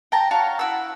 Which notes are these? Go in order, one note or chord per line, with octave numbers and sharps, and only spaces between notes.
G5 A5 A#5
F#4 C#5 F5 A5
E4 F#5 E6